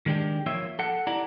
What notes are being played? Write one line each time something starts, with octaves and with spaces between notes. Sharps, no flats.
D#3 G#3 D4 G4
F3 A#3 F4 C#5 E5
A4 F#5
E4 G4 D5 F#5 A#5